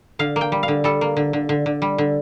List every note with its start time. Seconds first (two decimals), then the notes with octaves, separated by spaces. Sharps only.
0.19 D3 F5
0.36 A#3
0.41 G5
0.52 G3
0.63 F5
0.68 D3
0.84 G3 A4
1.01 A#3
1.17 D3
1.33 D3
1.49 D3
1.66 D3
1.82 G3
1.98 D3